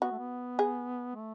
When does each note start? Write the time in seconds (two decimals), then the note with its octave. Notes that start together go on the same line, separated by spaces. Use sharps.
0.02 B3 F#4
0.11 A3
0.19 B3
0.59 G#4
1.15 A3